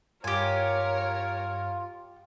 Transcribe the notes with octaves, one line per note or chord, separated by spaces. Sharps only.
G2 F4 G4 A#4 C#5 G#5